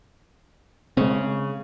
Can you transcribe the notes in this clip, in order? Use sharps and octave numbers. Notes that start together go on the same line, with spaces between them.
C#3 G#3 C4